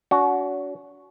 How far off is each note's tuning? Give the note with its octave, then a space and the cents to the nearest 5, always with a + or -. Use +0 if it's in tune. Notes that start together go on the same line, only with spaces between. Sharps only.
D4 -45 F#4 +0